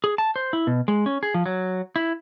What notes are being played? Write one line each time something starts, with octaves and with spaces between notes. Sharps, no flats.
G#4
A5
C5
E4
B2
G#3
C#4
G#4
F3
F#3
E4